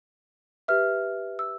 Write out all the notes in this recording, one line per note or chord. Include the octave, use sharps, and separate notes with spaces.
G4 B4 E5 F6
E6